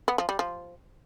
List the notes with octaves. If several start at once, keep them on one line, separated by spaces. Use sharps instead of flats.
B3
F3
G3
F3